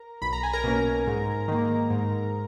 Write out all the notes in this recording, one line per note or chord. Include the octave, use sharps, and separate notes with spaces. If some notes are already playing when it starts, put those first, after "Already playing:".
Already playing: A#4 A#5
B1 B5
A#5
G#5
A#4 A#5
B2 A#3 C#4
G#2
D#3 A#3
G#2